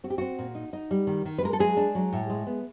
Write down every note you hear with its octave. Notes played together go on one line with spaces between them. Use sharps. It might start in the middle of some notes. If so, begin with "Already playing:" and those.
C4 F#4
G4
C4 F#4
A#2
D#4
D#4
G3
D#3
D#3
B4
G#3 A#4
A4
F#3 G#3 G#4
D4
F#3
A2
G#3
B3